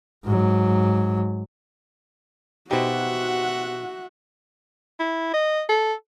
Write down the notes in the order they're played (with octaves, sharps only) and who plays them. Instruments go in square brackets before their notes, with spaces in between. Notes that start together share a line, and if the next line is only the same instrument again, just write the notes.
[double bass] G#2 F#3
[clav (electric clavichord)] B2 D#4 [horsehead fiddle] F#4 [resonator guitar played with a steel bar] G4 C5 [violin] E5 F#5
[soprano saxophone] E4
D#5
A4